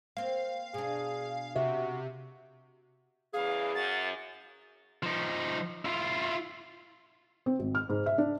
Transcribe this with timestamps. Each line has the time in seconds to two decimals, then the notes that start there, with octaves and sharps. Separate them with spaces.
0.17 A#3 C4 F5
0.74 B2 D4 G#4
1.56 C3 F#4 E5
3.34 E2 C#3 E3 G#4 F5
3.75 F#2 A6
5.03 F3 D#4
5.85 E4 F4
7.46 C4
7.59 G#1
7.75 F6
7.89 G#2
8.06 E5
8.18 D4